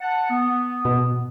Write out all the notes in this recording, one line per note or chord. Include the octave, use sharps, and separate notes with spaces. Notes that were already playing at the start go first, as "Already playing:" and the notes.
F#5 A5
B3
B2